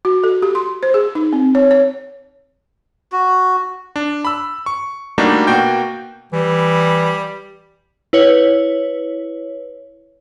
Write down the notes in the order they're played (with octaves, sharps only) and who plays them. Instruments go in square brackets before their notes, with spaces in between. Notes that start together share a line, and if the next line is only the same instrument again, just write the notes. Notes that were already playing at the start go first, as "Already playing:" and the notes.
[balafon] F#4
A4
G4
C6
C5
G#4
D#4
C4
C#5
C#5
[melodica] F#4
[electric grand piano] D4
B5 E6
C#6
G3 A3 A#3 D4 D#4 F#4
B2 A#3 F#4 G5 G6
[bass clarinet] E3 [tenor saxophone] G3
[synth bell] E4 B4 C#5